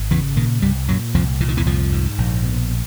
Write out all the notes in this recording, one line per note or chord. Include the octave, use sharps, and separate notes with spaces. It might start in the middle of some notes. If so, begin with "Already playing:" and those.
Already playing: G#1
E2 C#3 E3
A#2 D#3
C2 G2 G3
F#2 A#2 F#3
C2 F2 F3
A#2 E3
D#3
E2 E3
C2 F2 F3
G#2
A#1
B2